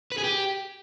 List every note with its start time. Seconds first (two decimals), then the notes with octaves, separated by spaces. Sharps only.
0.12 B4
0.18 G#4
0.24 G4